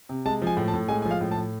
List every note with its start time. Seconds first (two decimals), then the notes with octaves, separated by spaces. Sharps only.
0.09 C3
0.26 G#3 A5
0.42 F3
0.47 G#5
0.57 A2
0.68 A5
0.74 A2
0.88 G#3 G#5
1.02 G#5
1.05 F3
1.11 F5
1.21 A2
1.31 A5
1.37 A2